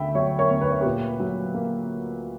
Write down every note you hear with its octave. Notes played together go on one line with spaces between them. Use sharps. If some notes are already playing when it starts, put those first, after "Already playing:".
Already playing: D2 D3 E5 G5 B5
F#3 C#5 E5
A#4 C#5
D2
B4
C#5
A#2 G4 B4
F#3
A#3